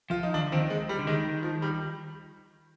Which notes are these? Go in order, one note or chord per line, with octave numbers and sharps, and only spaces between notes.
F3 F4
D#4
D#3 D4
D3
D#3 C4
G#3
G3
D3
D#3 G#3
F3
G3